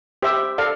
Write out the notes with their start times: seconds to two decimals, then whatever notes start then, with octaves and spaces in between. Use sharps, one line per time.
0.22 G4 C5 E5 G5
0.58 A4 D5 F5